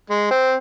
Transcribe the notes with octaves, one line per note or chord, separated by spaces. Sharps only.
G#3
C4